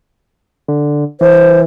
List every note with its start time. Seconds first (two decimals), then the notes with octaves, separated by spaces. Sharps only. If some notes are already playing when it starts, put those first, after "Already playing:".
0.68 D3
1.21 E3 C5